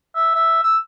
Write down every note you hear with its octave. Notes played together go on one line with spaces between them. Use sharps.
E5
E5
E6